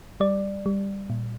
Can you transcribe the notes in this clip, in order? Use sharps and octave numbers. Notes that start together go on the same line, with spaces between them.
G3 D5
G3
A#2